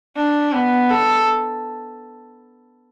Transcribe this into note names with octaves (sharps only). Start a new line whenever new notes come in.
D4
B3
A4